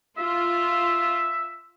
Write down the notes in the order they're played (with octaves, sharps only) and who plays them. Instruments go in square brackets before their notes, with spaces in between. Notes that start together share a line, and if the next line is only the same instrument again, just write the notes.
[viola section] F4 [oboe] E5